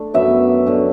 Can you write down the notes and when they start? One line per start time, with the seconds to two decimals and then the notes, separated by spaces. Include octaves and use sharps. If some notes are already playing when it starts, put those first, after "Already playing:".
Already playing: A3 D4
0.14 F#2 D3 F#3 B3 E5
0.66 D3 A3 C#4